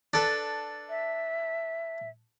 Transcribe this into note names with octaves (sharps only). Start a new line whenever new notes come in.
D4 A4 B4
E5